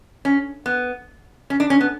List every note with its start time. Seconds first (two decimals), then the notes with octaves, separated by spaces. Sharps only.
0.25 C#4
0.66 B3
1.50 C#4
1.60 D4
1.70 C#4
1.81 B3